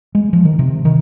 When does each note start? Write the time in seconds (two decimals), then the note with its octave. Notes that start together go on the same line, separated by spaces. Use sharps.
0.15 G#3
0.33 F3
0.45 D#3
0.59 C3
0.85 D#3